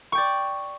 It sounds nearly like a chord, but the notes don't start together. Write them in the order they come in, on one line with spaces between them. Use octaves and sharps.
C#6 G5 D5